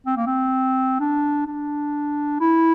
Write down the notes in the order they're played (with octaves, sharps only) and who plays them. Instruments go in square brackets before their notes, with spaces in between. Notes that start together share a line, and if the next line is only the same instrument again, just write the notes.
[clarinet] C4
A#3
C4
D4
D4
E4